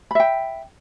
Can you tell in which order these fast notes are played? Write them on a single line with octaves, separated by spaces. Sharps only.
B5 E5 G5